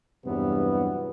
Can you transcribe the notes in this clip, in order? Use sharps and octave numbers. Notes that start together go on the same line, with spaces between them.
E2 G2 C3 E3 F#3 B3